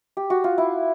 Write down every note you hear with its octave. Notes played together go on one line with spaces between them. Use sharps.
G4
F#4
F4
E4